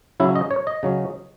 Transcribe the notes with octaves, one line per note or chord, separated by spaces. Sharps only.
C#3 F#3 C#4 E4
D#5
C#5
D#5
C#3 F#3 C#4